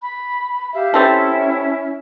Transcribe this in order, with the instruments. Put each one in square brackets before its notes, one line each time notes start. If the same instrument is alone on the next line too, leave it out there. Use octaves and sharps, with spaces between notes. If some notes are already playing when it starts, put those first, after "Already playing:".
[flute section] B5
G4 E5 F5
[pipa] G3 C4 A4 [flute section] C#4 E4 E5